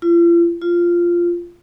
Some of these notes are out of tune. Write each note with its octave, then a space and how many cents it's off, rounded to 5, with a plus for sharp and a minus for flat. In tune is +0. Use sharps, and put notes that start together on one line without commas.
F4 -40
F4 -10